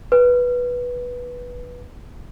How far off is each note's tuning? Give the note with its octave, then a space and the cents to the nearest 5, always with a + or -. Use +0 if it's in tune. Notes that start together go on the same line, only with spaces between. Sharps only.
B4 -10